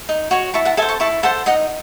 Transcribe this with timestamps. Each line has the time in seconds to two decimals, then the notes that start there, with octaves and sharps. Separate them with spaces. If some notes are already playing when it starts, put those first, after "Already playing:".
0.09 D#4
0.31 F#4 C#5
0.54 E4 A5 C#6
0.65 F#5 A5
0.77 A4 E5 G#5
0.82 C5
0.89 A5 C#6
1.00 E4 A5 C#6
1.23 A4 C5 F#5 A5
1.46 D#4 D#5 F#5